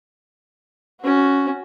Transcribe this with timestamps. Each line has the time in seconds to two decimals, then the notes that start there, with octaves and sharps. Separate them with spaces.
1.01 C#4 F#4